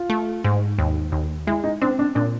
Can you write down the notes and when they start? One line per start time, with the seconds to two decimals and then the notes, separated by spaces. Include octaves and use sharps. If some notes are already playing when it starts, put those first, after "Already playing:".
Already playing: F4
0.10 A3
0.44 G#2
0.79 D#2
1.12 D#2
1.47 G#3 E4
1.64 D#4
1.82 C4 D4
1.99 D4
2.15 A#2 D4